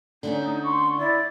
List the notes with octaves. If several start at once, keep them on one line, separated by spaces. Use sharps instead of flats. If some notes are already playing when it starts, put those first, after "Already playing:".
D3 A3 C#4 D#4
C6 C#6
E4 D5